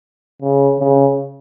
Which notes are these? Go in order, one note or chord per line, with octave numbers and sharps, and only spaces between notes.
C#3
C#3